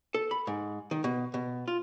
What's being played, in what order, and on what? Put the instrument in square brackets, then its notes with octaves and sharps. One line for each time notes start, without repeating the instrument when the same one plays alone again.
[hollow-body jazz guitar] A4
B5
G#2
D#3
B2
B2
F4